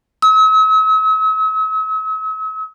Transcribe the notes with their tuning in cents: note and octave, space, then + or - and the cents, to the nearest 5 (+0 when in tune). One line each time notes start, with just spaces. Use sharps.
E6 -45